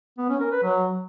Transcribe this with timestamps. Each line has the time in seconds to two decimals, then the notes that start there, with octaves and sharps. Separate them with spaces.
0.18 B3
0.29 C#4
0.40 A#4
0.52 B4
0.63 F#3